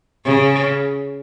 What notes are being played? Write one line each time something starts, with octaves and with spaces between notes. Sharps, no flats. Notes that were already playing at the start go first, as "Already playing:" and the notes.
C#3